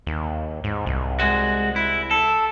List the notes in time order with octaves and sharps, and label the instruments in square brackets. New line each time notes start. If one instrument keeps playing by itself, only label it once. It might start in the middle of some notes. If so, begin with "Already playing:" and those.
[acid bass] D#2
G#2
C2
[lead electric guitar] G#3 F#4
E4
A4